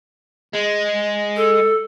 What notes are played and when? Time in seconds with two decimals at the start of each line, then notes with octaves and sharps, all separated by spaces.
0.53 G#3
1.37 A4